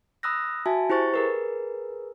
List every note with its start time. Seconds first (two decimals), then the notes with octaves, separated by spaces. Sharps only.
0.23 B5 D#6 E6 F#6 A#6
0.66 F#4 E5 G#5 A5
0.90 E4 G4 C5 C#6 A6
1.14 G#4 A#4 B4